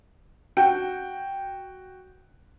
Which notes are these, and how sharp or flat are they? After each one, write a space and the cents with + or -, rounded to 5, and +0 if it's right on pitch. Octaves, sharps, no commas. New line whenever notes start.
F#4 +5 G5 +0